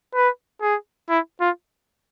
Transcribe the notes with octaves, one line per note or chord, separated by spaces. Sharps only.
B4
G#4
E4
F4